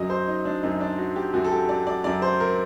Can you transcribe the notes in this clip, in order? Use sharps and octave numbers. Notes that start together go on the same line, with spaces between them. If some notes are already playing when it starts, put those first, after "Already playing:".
Already playing: F#2 F#3 D#5
C5
D#4
D4
F#2 F#3 D#4
D4
F#4
G4
F#2 F#3 F#4
A4
G4
D5
D5
F#2 F#3 D5
C5
A#4